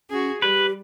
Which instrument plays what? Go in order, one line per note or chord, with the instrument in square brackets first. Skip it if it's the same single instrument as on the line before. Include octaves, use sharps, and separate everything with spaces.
[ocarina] C#4 [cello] F#4 G#4
[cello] G3 [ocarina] G4 [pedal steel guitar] B4